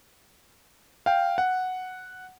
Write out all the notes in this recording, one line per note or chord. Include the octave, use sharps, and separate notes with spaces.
F5 G5
F#5